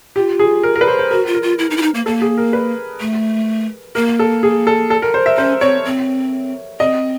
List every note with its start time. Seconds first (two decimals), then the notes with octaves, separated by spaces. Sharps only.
0.16 F4 G4
0.39 G#4
0.63 A#4
0.76 A#4
0.81 B4
0.88 C5
0.99 C5
1.11 F#4 A#4
1.27 F4
1.34 A#4
1.43 F4
1.59 E4
1.70 D#4
1.77 E4
1.82 D#4
1.94 A#3
2.06 A#3 A4
2.22 G#4
2.38 A#4
2.53 B4
3.00 A3
3.95 A#3 A#4
4.19 A4
4.43 G#4
4.67 A4
4.90 A4
5.02 A#4
5.14 C5
5.26 E5
5.37 C#4 C5
5.61 C4 C#5
5.85 C4
6.80 C4 D#5